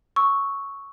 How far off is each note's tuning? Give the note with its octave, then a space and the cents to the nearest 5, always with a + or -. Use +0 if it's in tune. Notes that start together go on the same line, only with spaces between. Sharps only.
C#6 +0 E6 -15